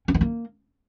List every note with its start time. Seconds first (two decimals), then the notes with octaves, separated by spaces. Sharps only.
0.08 C#4
0.14 B3
0.21 A#3